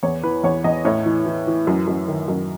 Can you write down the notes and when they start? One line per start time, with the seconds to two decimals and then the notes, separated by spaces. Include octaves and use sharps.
0.03 E2 C#5
0.23 E3 B4
0.43 E2 C#5
0.64 E2 D#5
0.85 A2 C#5
1.06 E3
1.26 E3
1.47 E3
1.67 F#2
1.88 F#2
2.08 D#3
2.28 F#2